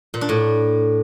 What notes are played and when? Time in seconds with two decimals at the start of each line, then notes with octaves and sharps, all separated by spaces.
0.14 A#2
0.21 D4
0.29 A2